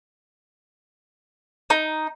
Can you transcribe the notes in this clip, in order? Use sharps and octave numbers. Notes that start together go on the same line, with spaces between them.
D#4